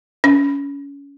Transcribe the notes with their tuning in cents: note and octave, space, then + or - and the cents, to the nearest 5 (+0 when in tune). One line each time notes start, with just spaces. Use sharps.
C#4 +25 B5 +0